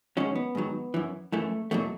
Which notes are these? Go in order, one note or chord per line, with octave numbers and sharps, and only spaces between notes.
G#2 D#3 F#3 C#4
B3
G#2 D#3 F#3
F#2 E3
F#2 E3 A3
E2 B2 F#3 A3